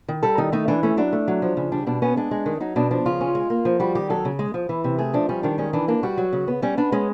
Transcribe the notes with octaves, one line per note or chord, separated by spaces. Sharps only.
D#3
G3 A4
D#3 D#4
A3 D#4
E3 D4
A3 C#4
F#3 D4
A3
F#3
F3
C#3
G3 D4
B2 D4
B3 C#4
G#3 D4
G#3
D#3
F#3 D#4
B2 D4
F3 D4
C#3 F4
C#4
G#3
A#3
F3
G3 F#4
D#3 G4
F#3 A4
C#3
G#3
F3
E3
C3
A3 G#4
F3 D4
G3 C#4
D#3 D4
G#3 C#4
E3 D4
A#3 D4
G3 F#4
F#3
C#3
B3
G3 C#4
B3 D4
G#3 C#4